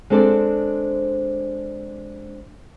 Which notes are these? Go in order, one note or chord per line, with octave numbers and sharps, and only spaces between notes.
G#3 C4 D4 A4 C5 D5